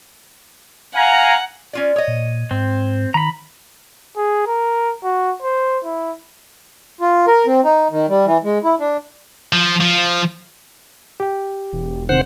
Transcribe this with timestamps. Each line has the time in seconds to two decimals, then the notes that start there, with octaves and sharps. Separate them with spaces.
0.95 F5 F#5 G#5 A#5
1.73 C#4 F4 D5
1.96 C#5 D#5
2.08 A#2
2.51 G#2 C4
3.14 D#3 A#5 B5
4.17 G#4
4.47 A#4
5.03 F#4
5.42 C5
5.84 E4
7.01 F4
7.27 A#4
7.46 C4
7.64 D#4
7.91 D#3
8.09 G3
8.26 E3
8.44 G#3
8.64 E4
8.80 D4
9.53 F3
9.81 F3
11.20 G4 G5
11.73 E1
12.09 C3 D#3 C5 F#5